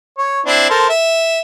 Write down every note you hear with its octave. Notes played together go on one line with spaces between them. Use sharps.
C#5
C4 D4 E4
A4 A#4 C5
E5